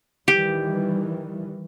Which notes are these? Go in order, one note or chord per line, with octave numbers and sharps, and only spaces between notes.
D#3 E3 G3 G4